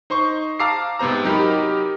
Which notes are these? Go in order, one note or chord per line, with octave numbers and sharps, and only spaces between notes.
D#4 C5 C6 C#6
F5 A5 A#5 D6 E6 C7
G#2 C3 B3 C5 A#5
F#3 D#4 G4 A#4 B5